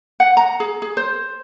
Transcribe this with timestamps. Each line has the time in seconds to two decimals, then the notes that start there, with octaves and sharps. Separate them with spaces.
0.20 F#5
0.37 A#5
0.60 G#4
0.82 G#4
0.97 C5